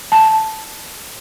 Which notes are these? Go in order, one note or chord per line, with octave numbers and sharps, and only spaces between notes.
A5